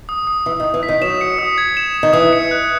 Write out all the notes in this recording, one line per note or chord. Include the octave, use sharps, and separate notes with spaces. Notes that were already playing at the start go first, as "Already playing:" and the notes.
D#6
D#6
E3 D#6
D#3
D#6
E3
B6
D#3
F#3 E7
C#7
D#6
G#6
E7
E7
D#3
E3 D#6
C#7
F#6